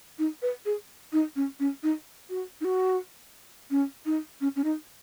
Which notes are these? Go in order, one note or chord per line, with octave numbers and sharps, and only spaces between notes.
D#4
B4
G#4
D#4
C#4
C#4
D#4
F#4
D#4
F#4
C#4
D#4
C#4
C#4
D#4